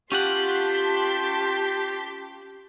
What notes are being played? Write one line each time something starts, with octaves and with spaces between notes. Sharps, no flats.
C#4 F4 G4 F#5 A5 C6 B6